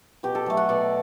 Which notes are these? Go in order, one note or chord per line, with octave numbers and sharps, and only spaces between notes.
B2 G4
A4
F#3 A3
F#5
B2 D5